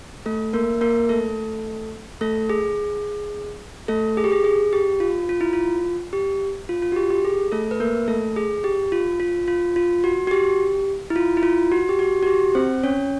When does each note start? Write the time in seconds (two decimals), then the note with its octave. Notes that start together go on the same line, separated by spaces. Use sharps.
0.26 A3 A4
0.53 A#3 A#4
0.81 A#3 A#4
1.09 A3 A4
2.21 A3 A4
2.49 G#4
3.88 A3 A4
4.17 G#4
4.24 G4
4.32 G#4
4.44 G#4
4.73 G4
5.00 F4
5.29 F4
5.41 E4
5.53 F4
6.13 G4
6.69 F4
6.82 F4
6.92 F#4
6.96 G4
7.10 G4
7.25 G#4
7.52 A3 A4
7.71 B4
7.80 A#3 A#4
8.08 A3 A4
8.36 G#4
8.64 G4
8.92 F4
9.20 F4
9.48 F4
9.76 F4
10.04 F#4
10.27 F#4
10.31 G4
11.10 E4
11.16 F4
11.37 E4
11.43 F4
11.72 F#4
11.89 G4
11.99 F#4
12.23 F#4
12.27 G4
12.55 C4 C5
12.83 C#4 C#5